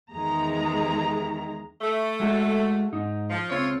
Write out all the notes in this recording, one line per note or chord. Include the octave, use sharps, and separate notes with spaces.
E2 D#3 G#3 G#4 A#5
A3
G#3 F#4 A4
G#2 D#4
F3
C#2 C4 F4 C#5